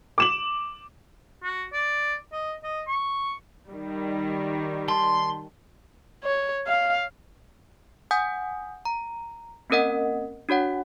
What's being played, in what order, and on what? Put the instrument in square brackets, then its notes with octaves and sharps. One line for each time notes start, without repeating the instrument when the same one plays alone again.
[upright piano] D6 E7 F#7
[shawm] F#4
D5
D#5
D#5
C#6
[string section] D#3 G3
[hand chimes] A5 [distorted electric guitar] C6
[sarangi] C#5
F5
[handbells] F#5 G#5 D#6 G6
A#5
A#3 C4 C#4 A#4 D#5 F#5
D4 F#4 C#5 F#5